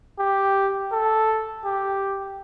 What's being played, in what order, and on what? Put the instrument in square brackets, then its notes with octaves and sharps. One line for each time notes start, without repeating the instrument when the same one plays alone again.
[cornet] G4
A4
G4